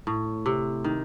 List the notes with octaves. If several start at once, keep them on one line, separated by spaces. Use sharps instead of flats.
A2
C3
D#3